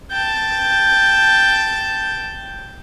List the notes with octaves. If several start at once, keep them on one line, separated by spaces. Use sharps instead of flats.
G5 A5